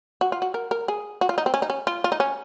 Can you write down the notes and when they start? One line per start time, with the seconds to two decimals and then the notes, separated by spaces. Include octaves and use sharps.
0.21 F#4
0.32 F4
0.42 F#4
0.54 A#4
0.71 A#4
0.88 G#4
1.21 F#4
1.29 F4
1.38 D#4
1.46 C4
1.54 C#4
1.62 D#4
1.70 C#4
1.87 F4
2.04 F4
2.12 D#4
2.20 C#4